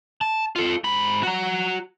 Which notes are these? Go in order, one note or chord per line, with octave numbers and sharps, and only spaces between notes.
A5
F4 A4
G#2 B5
F#4 A#5